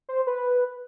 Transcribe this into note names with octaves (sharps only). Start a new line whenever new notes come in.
C5
B4